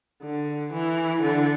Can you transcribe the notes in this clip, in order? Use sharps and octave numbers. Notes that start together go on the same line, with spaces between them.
D3
E3
D3